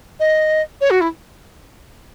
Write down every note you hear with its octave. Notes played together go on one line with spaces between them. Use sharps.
D#5
C#5
F#4
E4